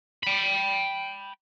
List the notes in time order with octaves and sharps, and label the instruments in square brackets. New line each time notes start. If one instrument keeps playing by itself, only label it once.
[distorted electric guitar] G5 B5